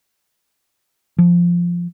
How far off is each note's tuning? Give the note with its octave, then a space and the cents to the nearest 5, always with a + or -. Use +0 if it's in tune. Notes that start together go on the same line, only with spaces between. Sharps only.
F3 -5